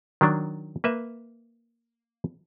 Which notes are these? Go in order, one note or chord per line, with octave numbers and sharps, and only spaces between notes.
D#3 F#3 D4
A#3 B4 E5